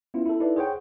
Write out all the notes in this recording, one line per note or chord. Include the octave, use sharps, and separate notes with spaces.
B3 C#4 E4 F4
E4 A4
D#4 E4 A4 B4 D5
G#4 C5 C#5 F#5 G5